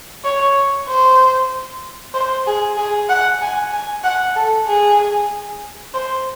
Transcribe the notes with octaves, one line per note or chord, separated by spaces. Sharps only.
C#5
C5
C5
G#4
G#4
F#5
G#5
G#5
F#5
A4
G#4
C5